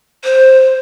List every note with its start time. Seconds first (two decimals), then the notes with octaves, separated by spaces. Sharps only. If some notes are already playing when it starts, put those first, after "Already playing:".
0.24 C5